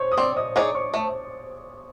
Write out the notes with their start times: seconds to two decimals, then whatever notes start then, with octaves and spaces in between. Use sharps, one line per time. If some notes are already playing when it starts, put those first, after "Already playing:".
Already playing: C5 C#5 C#6
0.12 D#6
0.17 C4 D5 D6
0.36 D#5 D#6
0.56 D#4 G#4 C#5 D5 D6
0.75 C#5 C#6
0.94 A3